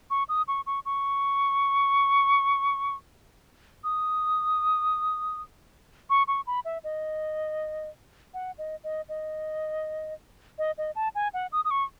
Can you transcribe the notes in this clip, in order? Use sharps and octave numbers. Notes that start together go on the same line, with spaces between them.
C#6
D#6
C#6
C#6
C#6
D#6
C#6
C#6
B5
E5
D#5
F#5
D#5
D#5
D#5
D#5
D#5
A5
G#5
F#5
D#6
D#6
C#6